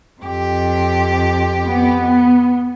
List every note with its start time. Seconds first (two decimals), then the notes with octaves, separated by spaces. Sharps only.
0.22 F2 G4
1.67 B3